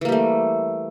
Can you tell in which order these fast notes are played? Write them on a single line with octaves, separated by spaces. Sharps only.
E3 A#3 G3 A3